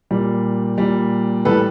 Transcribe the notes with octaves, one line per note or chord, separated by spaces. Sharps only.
A#2 G3
A#2 G3
A2 E3 G3 A4 B4